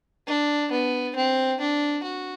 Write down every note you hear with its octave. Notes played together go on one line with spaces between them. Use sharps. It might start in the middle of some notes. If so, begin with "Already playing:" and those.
D4
B3
C4
D4
F#4